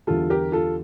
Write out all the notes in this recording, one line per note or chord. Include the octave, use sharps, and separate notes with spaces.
E2 D3 G3 F4 A4
G4 A#4
F4 A4